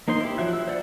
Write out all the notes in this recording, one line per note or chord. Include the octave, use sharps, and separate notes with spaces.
A#3 D#4 C5 C6
E4 G4
F3 F#3 E5 F#6
E6
C5 D5 F#5